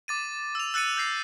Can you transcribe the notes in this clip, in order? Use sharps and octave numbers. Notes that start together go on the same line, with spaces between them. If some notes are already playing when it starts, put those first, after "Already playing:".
D6 A6 D#7
E6 F7
E6 F#6 A6 C#7 D#7
E6 G6 A#6 C7